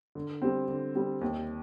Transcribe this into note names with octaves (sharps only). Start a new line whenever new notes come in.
D3
G3 C4
D3
G3 C4
D#2